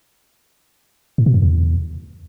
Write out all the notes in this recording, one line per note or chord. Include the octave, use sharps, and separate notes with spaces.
A2
B2
F#2
E2